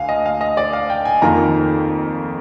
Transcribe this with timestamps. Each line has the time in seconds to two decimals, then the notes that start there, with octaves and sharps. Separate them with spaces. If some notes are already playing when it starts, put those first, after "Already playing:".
Already playing: D2 D3 F5 G#5
0.09 D#5
0.26 F5
0.41 D#5
0.57 D5
0.73 F5
0.90 G5
1.05 G#5
1.22 F2 D#3 A#3 F4 A#5